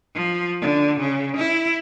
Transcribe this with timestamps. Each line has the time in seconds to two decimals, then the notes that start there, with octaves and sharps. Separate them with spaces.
0.15 F3
0.61 D3
1.00 C#3
1.37 E4